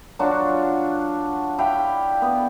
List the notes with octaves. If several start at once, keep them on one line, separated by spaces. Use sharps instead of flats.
F#3 D4 F4 F#4
E4 G4 F5 G5
B3